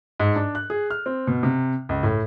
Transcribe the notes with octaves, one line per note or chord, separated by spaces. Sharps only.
G#2
D4
F#6
G#4
F6
C4
B2
C3
C#2
A2